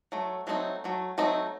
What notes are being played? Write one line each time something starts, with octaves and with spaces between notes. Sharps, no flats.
F#3 A3
F#3 A3 C4 D#4
F#3 A3
F#3 A3 C4 D#4